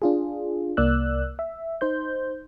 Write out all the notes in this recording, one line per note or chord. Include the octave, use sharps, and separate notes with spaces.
D4 F4 G#4
C2 A#3 D5 E6 F#6
E5
D#4 C5 G6